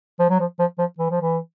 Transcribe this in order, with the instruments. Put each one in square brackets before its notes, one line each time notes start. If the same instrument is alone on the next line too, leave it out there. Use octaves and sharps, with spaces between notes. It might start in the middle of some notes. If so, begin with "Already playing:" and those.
[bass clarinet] F3
F#3
F3
F3
F3
E3
F3
E3